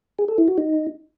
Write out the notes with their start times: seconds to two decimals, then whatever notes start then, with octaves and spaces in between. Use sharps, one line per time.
0.19 G#4
0.28 A4
0.38 E4
0.48 F#4
0.58 D#4